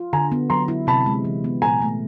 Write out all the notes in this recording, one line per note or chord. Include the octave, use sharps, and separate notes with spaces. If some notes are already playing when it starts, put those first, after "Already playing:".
Already playing: F4
D3 G#5 A#5
B3
F#3 A#5 C6
E4
C3 A5 B5
G#3
E3
B3
A#2 G#5 A#5
A3